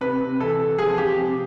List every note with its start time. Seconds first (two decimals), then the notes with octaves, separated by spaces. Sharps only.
0.01 C3 B4
0.20 C3
0.40 E3 A4
0.59 C3
0.78 F3 G#4
0.98 F3 G4
1.17 C3